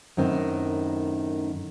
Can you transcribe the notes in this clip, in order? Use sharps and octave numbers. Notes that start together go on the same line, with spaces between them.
F#2 A2 D#3 C4